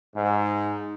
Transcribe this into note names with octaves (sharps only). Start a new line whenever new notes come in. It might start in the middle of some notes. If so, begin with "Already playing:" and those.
G#2